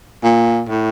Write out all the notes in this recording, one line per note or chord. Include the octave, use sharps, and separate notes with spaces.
A#2
A2